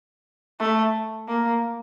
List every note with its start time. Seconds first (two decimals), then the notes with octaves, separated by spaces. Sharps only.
0.60 A3
1.28 A#3